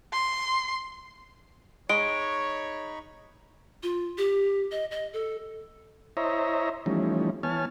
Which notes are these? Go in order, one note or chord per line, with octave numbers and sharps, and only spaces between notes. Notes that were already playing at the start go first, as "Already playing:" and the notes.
C6
G#3 D#4 C#5 B5 C#6 D7
F4
G4
D#5
D#5
A4
E4 C5 C#5 D#5 E5 A#5
E3 F3 G3 A3 C#4 D#4
E3 B3 C#5 G#5 A5 F6